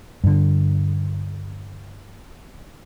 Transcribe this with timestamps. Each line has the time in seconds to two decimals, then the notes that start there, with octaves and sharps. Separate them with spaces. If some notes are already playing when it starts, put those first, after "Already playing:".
0.24 G2 D3